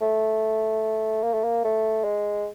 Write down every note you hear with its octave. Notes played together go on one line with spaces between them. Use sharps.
A3
A#3
A3
A#3
A3
G#3